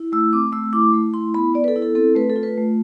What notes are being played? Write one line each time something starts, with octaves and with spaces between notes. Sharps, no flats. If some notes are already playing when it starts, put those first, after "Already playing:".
Already playing: E4
A3 E6
C4 D6
A3 E6
E4 D6
A3
E4 C6
B3 B5
B3 D5
B4
A4
E4
A4
C4 A4
A3 B4
A4
F4
B4
A3